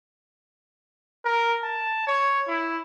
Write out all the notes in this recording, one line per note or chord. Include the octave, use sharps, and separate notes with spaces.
A#4
A5
C#5
E4